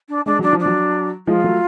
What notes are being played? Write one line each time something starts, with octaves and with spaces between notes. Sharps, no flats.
D4
G#3 D4
F#3 D4
F3
D4
F#3
F3 G#3 F4
F#3 A3